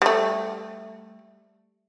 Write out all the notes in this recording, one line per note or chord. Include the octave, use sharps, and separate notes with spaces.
G3 A3